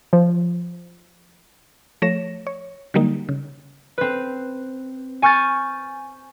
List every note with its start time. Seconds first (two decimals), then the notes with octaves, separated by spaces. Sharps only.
0.13 F3
2.02 F3 A3 C#5 A#6 E7
2.47 C#5
2.94 D3 F#3 G3 A#3 D#4
3.29 C#3
3.98 C4 B4
5.22 G#5 C#6 F6 G6 A6